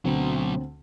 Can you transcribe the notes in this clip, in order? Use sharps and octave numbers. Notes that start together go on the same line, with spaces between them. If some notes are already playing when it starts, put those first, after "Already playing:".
D2 B2 F#3 C4